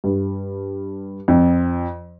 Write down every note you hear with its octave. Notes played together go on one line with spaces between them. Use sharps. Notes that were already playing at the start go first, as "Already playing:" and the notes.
G2
F2